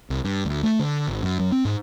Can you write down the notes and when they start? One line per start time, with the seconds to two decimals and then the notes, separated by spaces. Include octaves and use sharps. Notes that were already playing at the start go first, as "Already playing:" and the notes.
0.10 C2
0.25 G2
0.45 D2
0.63 A3
0.79 D3
1.08 G#1
1.23 F#2
1.40 F#2
1.52 C4
1.65 G#2